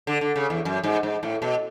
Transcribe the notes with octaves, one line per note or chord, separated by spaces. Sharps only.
D3
D3
C#3
E2
F#2
G#2
G#2
A2
B2